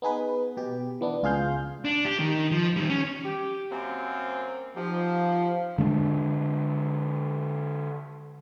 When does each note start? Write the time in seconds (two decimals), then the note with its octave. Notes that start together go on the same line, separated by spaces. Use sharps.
0.02 B3 D#4 G#4 B4
0.57 B2 G4
1.01 E3 B3 D4
1.23 C#2 F4 G#4 F5 G6
1.85 D4
2.05 G4
2.19 D#3
2.51 F3
2.76 D#3 G3
2.89 C#4
3.24 G4
3.70 F#2 A#3 C4
4.76 F3 B3 D#4 G4
5.78 D3 G#3 C4 D4